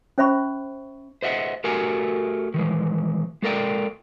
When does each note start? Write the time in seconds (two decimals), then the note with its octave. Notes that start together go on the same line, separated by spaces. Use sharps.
0.18 C#4 C5 E5 B5 C#6
1.22 C5 D#5 E5 F#5
1.64 A3 F#4 G4 A#4 G#5
2.54 D#3 E3 G#3
3.42 G#3 A4 A#4 D5 G5